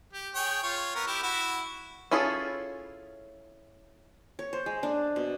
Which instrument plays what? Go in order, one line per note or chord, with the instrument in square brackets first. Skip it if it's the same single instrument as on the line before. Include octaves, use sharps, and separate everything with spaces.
[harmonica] G4
G#4 C#5 G5
F4 C#5
B3 A#4
E4 G4
E4 F#4
[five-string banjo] C#4 E4 F4 G#4 A4
[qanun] C#5
C5
G#3
D4
B2